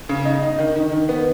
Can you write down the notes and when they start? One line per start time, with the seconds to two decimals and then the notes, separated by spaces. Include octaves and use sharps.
0.09 C#3
0.25 D#4
0.43 D#4
0.59 D#3
0.75 D#3
0.92 D#3
1.09 B3